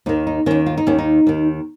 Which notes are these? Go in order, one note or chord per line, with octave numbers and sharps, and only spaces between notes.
D#2 D#3 D#4
D#4
D#2 D#3 C#4
F4
D#4
D#2 D#3 C#4
D#4
D#2 D#3